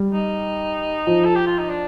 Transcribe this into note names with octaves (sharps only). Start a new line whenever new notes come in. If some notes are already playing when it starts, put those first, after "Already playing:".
Already playing: G3
D#4
F3
A4
G4
F4
D#4
D4